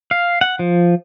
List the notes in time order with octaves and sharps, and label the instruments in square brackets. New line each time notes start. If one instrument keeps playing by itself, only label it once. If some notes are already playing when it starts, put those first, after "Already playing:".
[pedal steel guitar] F5
F#5
F3